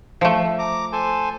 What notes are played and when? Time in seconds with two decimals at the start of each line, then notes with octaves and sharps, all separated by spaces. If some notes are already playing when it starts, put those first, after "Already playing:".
0.21 F3 A3
0.59 A#5 D6
0.92 A4 C5 G#5